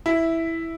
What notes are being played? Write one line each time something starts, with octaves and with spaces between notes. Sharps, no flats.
E4